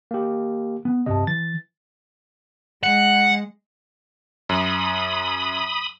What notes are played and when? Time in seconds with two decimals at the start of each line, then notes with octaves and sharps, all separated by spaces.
0.11 A#3 G4
0.85 B3
1.06 C2 G2 C3 D#5 A5
1.27 E3 A6
2.83 G#3 F#5
4.49 F#2 B5 D#6